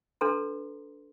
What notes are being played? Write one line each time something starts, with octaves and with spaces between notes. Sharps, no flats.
D4 A4 B4 A#5 C6